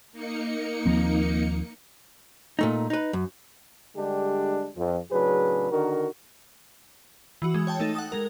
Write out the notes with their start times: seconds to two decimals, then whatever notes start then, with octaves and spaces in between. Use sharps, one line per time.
0.12 A#3 D#4 C#7
0.86 D#2 F3 C4
2.59 A#2 A3 D#4
2.90 D#4 B4
3.13 F#2
3.96 D3 G3 G#3 D4 G4
4.76 F2 F3
5.10 A2 C#3 F#3 D4 G#4 B4
5.71 D3 D#3 D4 F#4 A#4
7.42 E3 F#4
7.54 G#3
7.67 C#5 G5 A5
7.80 A3 D#4 A4
7.95 F#5 D#6
8.12 G#3 A#4